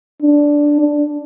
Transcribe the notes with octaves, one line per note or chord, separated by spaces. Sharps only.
D4
D4